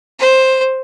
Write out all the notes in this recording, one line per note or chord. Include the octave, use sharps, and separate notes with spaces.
C5